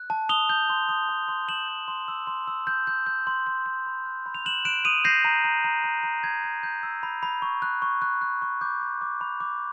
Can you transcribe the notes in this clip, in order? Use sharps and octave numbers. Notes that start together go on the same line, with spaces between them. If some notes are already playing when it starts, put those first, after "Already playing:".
Already playing: F#6
A5
D#6 F7 G7
G6
C6
D#6
A5
C6
C6 E7 F#7
G6
C6
E6
C6
E6
G6
G6
G6
C6
C6
C6
B5
F#6
B5
F7
F#6 E7 F#7
F#6 D7 E7
D#6 D#7 F7
G6 A#6 C7
A#5
A#5
A#5
A#5
A#5
G6 G#6
G6
G6
E6
B5
B5
C#6
F#6
C#6
F#6
F#6
C#6
D6 G6
B5
D6
B5
D6